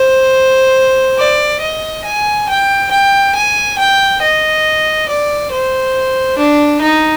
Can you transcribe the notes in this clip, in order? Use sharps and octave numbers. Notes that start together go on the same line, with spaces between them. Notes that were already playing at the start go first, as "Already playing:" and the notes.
Already playing: C5
D5
D#5
G#5
G5
G5
G#5
G5
D#5
D5
C5
D4
D#4